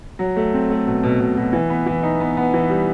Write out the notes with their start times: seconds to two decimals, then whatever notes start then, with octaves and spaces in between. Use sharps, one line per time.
0.19 F#3
0.36 A3
0.54 C4
0.70 A3
0.86 B2
1.03 B2
1.19 B2
1.37 B2
1.53 E3
1.70 B3
1.86 E3
2.03 D#4
2.20 B3
2.37 B3
2.54 E3
2.70 G3